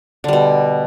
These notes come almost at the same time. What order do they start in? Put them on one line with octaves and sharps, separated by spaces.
D3 G3 B2